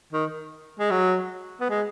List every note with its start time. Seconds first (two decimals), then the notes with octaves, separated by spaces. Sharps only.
0.13 D#3
0.79 G#3
0.91 F#3
1.60 B3
1.70 G#3